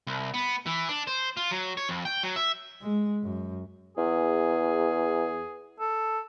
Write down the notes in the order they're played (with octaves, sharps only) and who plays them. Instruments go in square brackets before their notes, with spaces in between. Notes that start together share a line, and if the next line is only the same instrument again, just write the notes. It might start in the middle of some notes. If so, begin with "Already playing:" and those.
[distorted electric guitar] C2
B3
E3
D4
C5
F4
F#3
C#5
F2
G5
F#3
E5
[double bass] G#3
F#2
[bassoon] E2 [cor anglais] G#4
[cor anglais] A4